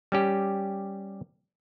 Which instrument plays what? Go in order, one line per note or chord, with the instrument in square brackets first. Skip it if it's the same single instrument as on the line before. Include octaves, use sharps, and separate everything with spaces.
[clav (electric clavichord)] G3 C#4 G4